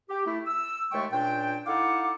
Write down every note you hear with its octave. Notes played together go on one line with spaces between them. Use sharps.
G4
A3 E4
E6
D#2 G#3 A3 G5 C#6
C#2 A#2 D4 G5
D#4 E4 A4 F5 F#5 D6